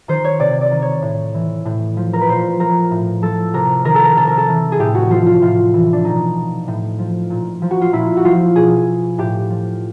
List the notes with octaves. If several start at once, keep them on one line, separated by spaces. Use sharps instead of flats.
D#3 C5
C#5
C3 D5
D5
D#3
C#5
A2
E3
A2
F3
A#4
B4
A#2 C5
F3 A#4
A2
F3 A4
C3 A#4
D#3 A#4
A4
A#4
C3 A4
A#4
A4
E3
G#4
A2 G4
F#4
F3 F4
F4
A2 F4
E3
D4
B2 D#4
A2
F3
A#2
F3
F#4
F4
A#2 E4
F#4
F3 F4
B2 G#4
A2 G4
F3